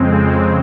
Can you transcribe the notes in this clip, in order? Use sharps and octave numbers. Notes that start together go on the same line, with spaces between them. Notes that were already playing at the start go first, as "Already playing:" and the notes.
Already playing: F2 C#3 G#3 C4